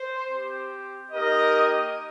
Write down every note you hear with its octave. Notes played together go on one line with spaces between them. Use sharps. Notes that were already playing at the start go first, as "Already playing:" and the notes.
Already playing: C5
C4 G4
A#3 D#4 G4 A#4 D#5